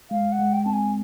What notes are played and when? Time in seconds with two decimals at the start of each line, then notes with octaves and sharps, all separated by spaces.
0.11 G#3 F5
0.32 F#5
0.39 G#3
0.53 G5
0.65 C4 A5
0.73 G#5